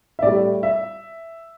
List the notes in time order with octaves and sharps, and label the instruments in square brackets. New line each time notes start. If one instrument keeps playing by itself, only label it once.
[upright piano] E5
A2 G3 D5
E5